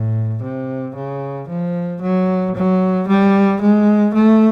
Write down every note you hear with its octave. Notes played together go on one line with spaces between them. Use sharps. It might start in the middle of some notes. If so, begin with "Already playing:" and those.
Already playing: A2
C3
C#3
F3
F#3
F#3
G3
G#3
A3